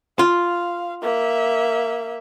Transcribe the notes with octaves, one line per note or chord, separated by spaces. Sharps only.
F4 F5
A#3 E5